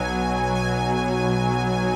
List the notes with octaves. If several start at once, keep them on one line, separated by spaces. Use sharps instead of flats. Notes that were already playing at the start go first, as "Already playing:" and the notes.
Already playing: B1 B2 F#3 G#5
G#5